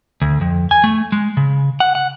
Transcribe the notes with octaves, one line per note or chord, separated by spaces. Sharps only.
D2
F2
G#5
A3
G#3
C#3
F#5
F#5